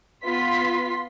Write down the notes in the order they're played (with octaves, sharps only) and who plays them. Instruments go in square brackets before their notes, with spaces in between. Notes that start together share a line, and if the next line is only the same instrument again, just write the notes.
[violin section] B3 F4 C6 B6